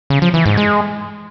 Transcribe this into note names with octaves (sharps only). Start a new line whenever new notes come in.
C#3
F3
E3
G#2
G#3